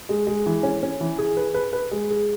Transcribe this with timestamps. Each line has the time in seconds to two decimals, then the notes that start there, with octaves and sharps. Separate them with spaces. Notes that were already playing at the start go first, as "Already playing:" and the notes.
0.09 G#3
0.27 G#3
0.46 E3
0.63 C#4
0.83 C#4
1.01 E3
1.18 G#4
1.37 B4
1.54 B4
1.73 B4
1.91 G#3
2.10 G#4